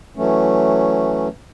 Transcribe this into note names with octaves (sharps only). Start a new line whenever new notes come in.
E3 F#3 A3 C#4